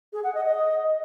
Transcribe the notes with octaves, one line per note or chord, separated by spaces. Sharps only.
G#4
F#5
D#5
D#5